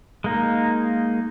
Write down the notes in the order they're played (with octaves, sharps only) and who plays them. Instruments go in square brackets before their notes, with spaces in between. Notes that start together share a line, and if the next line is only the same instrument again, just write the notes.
[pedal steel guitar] G#3 A#3 D#4